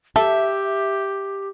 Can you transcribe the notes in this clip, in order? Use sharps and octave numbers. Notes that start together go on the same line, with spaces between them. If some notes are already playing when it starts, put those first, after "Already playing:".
G4 A4 E5